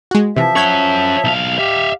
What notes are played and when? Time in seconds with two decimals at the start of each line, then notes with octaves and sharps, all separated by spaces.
0.11 G#3 F#4
0.36 C3 E3 F3 E5
0.56 C#4 F#5 C#6 G#6 B6
1.24 B1 F5
1.58 G4 E5 F5